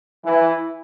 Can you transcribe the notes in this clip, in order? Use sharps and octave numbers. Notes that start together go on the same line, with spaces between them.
E3